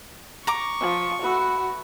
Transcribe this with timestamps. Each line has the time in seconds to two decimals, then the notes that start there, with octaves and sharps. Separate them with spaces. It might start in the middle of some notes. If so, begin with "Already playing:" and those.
0.47 A#5 C#6 D6
0.81 F3
1.22 A3 F#4 B4 E6